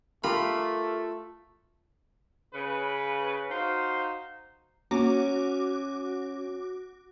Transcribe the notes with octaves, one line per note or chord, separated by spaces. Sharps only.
A3 F4 G4 A#4 B5
C#3 B4
D#4 F#4 C5 F5
A#3 C#4 F#4 D6